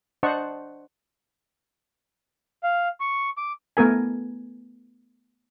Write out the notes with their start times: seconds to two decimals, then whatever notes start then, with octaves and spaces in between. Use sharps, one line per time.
0.23 D4 C5 D#5 F#5 A5 C#6
2.63 F5
3.00 C#6
3.37 D6
3.77 A3 B3 A#4 G#5